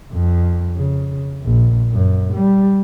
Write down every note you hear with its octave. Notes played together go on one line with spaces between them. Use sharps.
F2
C#3
A#1
F#2
G3